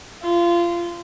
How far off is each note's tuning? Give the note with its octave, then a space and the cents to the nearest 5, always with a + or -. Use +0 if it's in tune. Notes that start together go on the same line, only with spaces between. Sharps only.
F4 -20